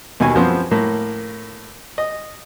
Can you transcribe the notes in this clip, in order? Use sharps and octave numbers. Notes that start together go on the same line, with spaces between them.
D#2 B2 G#5
F#2 F3 B3 C4
A2 A#3
D#5